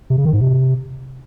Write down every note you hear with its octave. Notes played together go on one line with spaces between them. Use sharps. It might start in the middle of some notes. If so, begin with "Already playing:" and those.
C3
C#3
D#3
G#2
C3